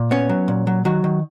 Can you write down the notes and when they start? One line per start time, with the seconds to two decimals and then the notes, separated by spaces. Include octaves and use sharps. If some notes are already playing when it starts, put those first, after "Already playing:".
Already playing: A#2
0.11 B3 C#4 C#5
0.29 F#3
0.48 A#2
0.67 F#3
0.85 D#3 F#3 F#4
1.04 D#3